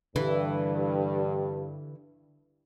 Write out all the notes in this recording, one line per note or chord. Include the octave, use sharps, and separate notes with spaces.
G2 D3 E3